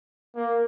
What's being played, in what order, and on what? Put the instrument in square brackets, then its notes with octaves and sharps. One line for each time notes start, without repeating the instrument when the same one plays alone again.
[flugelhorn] A#3